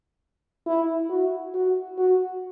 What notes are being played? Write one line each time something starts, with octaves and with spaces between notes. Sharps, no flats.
E4
F#4
F#4
F#4